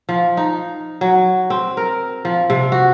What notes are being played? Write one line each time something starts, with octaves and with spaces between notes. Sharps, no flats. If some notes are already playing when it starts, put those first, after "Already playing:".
F3
D#4
F#3
C4
A#4
F3
C3
F#4